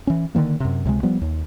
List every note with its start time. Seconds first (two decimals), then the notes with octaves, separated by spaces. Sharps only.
0.07 E3 C#4
0.35 D3 D#3 F#3 A#3
0.60 F#2 C3
0.85 C#2 C3 E3 G#3
1.03 F3 G3 B3
1.21 D#2